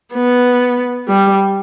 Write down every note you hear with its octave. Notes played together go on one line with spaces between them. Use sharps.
B3
G3